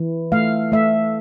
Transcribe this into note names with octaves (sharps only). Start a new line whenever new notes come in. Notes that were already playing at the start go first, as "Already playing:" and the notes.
Already playing: E3
A3 F5
A3 E5